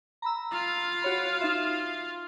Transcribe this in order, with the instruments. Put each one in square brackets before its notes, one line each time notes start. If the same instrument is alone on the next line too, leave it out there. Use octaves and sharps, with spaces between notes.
[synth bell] A#5 B5 E6
[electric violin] F4 F5
[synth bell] F#4 C#5 B5
D#4 E5